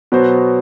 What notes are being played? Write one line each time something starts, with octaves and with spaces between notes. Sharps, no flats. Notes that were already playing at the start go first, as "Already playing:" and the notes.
B2 F#3 B3 F#4 C5